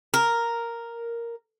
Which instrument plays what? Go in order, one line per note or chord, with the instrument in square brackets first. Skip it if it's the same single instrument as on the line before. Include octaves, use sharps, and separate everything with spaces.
[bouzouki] A#4